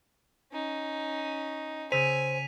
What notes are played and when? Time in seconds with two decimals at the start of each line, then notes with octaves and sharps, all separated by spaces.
0.52 C#4 D#4
1.92 C#3 C5 G#5 E6 B6 D#7 F7